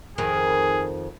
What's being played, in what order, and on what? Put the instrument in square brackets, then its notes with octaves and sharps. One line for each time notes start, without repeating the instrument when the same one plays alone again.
[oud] F2 D#3 [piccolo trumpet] G#4